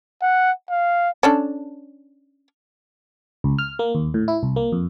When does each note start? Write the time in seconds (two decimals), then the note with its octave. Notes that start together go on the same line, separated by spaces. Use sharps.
0.22 F#5
0.70 F5
1.23 C#4 D4 A4
3.44 C#2
3.59 F6
3.79 A#3
3.95 D#2
4.14 A2
4.28 E4
4.43 C2
4.56 A#3
4.72 F2